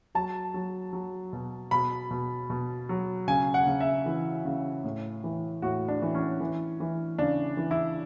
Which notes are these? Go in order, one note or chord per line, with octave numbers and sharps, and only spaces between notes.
F#3 A5
F#3
F#3
B2
B2 B5
B2
B2
F#3
C#3 G#5
F#5
C#3
E5
E3
C#3
A2
E3
A2 F#4
D4
E3
C#4
E3
E3
C#3 D4
E3
E4